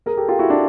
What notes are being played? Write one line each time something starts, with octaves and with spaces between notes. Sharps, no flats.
G#4 A#4
G4 A4
F4 G4
E4 F#4
D4